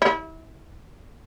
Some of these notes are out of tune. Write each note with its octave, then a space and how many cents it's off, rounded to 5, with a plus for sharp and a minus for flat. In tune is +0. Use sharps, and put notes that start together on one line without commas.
E4 -30